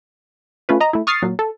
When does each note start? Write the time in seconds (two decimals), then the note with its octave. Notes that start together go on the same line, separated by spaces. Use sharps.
0.69 A3 C#4 F4 B4
0.80 D#5 A#5
0.93 A3 E4
1.07 C#6 D#6 F6 A6 C7
1.22 A#2 F#3
1.39 A4